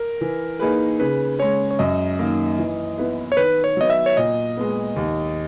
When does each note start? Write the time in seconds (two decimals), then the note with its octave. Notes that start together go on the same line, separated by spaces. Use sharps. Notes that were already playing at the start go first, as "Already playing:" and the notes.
Already playing: A#4
0.21 E3
0.59 A#3 D#4 G#4 B4
1.00 C#3 B4
1.39 G#3 C#4 C#5
1.71 C#5
1.79 F#2 D#5
2.19 D#3 A#3
2.59 E3
2.98 B3 E4 B4
3.32 C#5
3.37 D#3 B4
3.64 C#5
3.77 F#3 B3 D#5
3.90 E5
4.06 C#5
4.17 A#2 D#5
4.57 G#3 B3
4.96 D#2